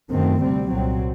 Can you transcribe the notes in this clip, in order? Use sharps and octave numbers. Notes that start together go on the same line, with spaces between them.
F#2 D#3 A3 C4
D2 C3 G3 C4
C2 A#2 F#3 C4